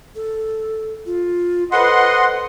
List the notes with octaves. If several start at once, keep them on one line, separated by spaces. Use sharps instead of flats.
A4
F4
A4 B4 C5 D#5 F#5 C6